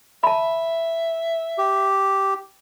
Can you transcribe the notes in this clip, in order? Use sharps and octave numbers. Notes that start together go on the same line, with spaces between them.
E5 A5 B5
G4